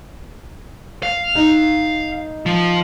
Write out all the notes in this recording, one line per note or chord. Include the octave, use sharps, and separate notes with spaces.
F5
D#4
F3